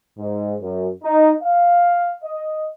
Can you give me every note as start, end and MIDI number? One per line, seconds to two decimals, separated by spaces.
0.19 0.56 44
0.61 0.90 42
1.04 1.32 63
1.43 2.17 77
2.24 2.67 75